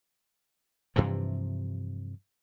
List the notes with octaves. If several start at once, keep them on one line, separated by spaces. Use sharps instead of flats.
G2 C3 E3 F3